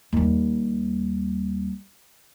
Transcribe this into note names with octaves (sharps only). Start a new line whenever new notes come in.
D#2 G3